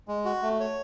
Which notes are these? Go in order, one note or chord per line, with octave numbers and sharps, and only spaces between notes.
G#3
F#4
A3
C#5